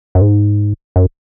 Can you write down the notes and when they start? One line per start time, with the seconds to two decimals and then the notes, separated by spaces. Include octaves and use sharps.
0.15 F#2
0.21 G#2
0.96 F#2